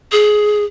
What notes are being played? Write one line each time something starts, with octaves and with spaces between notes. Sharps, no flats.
G#4